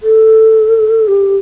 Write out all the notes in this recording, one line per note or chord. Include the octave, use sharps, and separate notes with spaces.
A4
G4